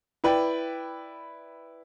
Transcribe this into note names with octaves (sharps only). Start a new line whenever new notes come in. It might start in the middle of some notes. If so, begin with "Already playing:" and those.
E4 B4 D5 G5